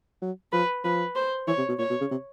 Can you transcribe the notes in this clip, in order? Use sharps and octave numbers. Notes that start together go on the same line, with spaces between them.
F#3
F3 B4
F3 B4
C5
E3 C#5
C3
B2
A#2 C#5
B2
C#3
C3